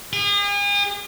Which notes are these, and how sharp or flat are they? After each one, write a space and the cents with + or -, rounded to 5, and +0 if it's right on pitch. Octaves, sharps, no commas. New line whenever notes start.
G#4 -40